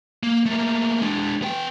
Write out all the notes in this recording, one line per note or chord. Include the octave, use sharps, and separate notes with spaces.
A#3
A3 A#3
G#3 D4
B3 G5